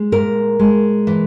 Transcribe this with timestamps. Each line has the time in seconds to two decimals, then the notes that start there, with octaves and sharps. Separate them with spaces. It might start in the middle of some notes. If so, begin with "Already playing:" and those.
Already playing: G#3
0.12 A#2 A#4
0.59 G#3
1.07 E3